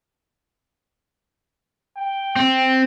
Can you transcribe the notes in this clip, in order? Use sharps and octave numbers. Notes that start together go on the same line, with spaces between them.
G5
C4